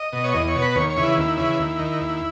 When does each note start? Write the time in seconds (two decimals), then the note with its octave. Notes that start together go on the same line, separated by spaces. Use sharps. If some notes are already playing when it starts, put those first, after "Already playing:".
Already playing: D#5
0.13 B2
0.24 C#5
0.34 E2 D#5
0.48 C#5
0.55 B2
0.62 B4
0.76 D#2 C#5
0.90 C#5
0.97 C#3 E3
1.03 E4
1.17 D#2 E4
1.37 C#3 E3
1.59 D#2
1.79 D#3
2.01 D#2